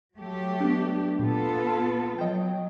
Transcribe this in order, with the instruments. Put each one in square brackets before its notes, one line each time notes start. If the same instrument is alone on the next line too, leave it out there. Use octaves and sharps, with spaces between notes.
[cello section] F#3 A3 G4
[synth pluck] B3 D4
[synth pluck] A#2 [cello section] B3 F4 A4
[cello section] F#3 [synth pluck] D#5 G5